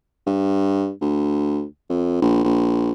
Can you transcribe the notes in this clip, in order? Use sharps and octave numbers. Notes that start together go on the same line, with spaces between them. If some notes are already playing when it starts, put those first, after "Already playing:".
G2
D2
F2
A#1
A#1